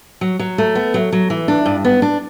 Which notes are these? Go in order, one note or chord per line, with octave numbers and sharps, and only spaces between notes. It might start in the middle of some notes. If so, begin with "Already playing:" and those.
F#3
F#3
A3
B3
F#3
F#3
E3
D4
G2
B3
D4